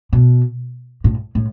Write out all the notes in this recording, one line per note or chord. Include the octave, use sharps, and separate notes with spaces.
B2
A2
A2